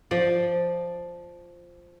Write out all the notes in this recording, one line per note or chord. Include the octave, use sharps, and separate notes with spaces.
F3 D5